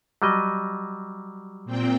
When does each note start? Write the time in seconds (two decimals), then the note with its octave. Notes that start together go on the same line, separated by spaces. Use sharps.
0.22 F#3 G3 D#5
1.65 A#2 C4 G5